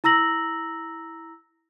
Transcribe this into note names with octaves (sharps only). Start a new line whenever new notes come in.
E4 A#5 E6 A#6 F#7